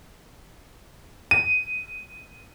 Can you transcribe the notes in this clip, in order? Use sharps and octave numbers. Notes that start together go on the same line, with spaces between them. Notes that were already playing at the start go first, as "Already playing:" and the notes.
D#7